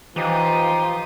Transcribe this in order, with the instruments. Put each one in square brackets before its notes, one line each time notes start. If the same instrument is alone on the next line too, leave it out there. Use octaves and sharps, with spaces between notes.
[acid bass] E3 [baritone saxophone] F3 [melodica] D#4 G4 [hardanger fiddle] F4 D#6